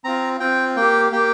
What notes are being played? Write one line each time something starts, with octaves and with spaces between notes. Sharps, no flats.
C4 F4 A#5
C4 F4 G5
A#3 G4 G5
A#3 G4 G5